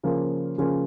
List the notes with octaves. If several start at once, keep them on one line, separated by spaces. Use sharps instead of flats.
C#3 F3 A#3 C#4 F4
C#3 F3 A#3 C#4 F4